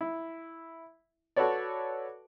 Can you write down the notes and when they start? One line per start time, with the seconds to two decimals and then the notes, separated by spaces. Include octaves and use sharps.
0.01 E4
1.36 F#4 A4 B4 C#5 D5